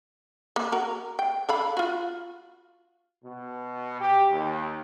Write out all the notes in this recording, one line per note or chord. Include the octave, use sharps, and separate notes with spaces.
A#3
F#4 A#4
G5
A4 F5 B5
F4 F#4
B2
G4
D#2